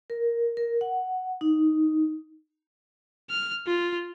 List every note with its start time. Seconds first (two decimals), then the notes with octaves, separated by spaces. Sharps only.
0.10 A#4
0.57 A#4
0.81 F#5
1.41 D#4
3.30 F6
3.66 F4